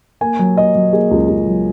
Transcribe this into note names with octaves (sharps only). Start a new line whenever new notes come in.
A#3 G#5
F#3
A#3 D#5
F#3
A#3 G#4
C#2
C#2
F#3